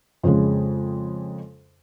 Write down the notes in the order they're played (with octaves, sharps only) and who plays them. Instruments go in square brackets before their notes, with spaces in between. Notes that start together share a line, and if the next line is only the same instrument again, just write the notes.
[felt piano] F2 C#3 G#3